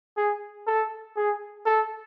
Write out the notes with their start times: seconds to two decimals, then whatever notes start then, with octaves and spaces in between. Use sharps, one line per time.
0.17 G#4
0.67 A4
1.17 G#4
1.66 A4